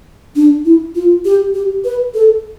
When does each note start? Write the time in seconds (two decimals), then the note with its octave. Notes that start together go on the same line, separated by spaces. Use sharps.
0.36 D4
0.65 E4
0.95 F4
1.25 G4
1.54 G4
1.85 B4
2.14 A4